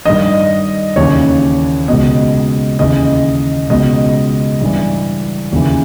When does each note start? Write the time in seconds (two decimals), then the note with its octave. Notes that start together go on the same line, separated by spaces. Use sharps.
0.05 G2 D#3 D#5
0.96 D#2 C#3 E3 C#5
1.88 C#2 B2 D#5
2.79 D#2 C#3 E3 D#5
3.70 C#2 B2 D#5
4.61 G2 E3
5.52 D#2 C#3 E3